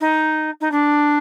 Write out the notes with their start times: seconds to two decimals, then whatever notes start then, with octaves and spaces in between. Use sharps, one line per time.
0.01 D#4
0.61 D#4
0.72 D4